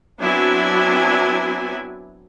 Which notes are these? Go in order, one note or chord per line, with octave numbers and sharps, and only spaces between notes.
F#3 B3 C4 D4 E4 G#5